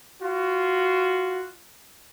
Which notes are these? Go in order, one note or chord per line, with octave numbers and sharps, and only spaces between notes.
F4 F#4